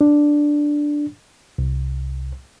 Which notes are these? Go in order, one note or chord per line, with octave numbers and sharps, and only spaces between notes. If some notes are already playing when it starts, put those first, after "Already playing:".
D4
C2